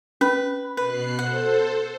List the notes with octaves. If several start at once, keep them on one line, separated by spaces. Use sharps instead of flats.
C#4 B4
B2 B4 F#6 C7
A4 C5 F#5